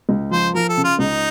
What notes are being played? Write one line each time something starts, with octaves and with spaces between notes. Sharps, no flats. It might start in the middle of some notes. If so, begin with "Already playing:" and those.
C#2
F3 C5
F3 A#4
A4
C#3
F4
C#2 D#4